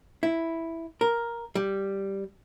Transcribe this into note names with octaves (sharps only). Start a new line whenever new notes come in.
E4
A#4
G3